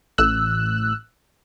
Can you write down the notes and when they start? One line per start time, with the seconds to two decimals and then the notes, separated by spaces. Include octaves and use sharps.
0.18 A1 E6 F#6